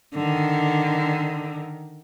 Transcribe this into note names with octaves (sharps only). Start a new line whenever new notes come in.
D3 D#3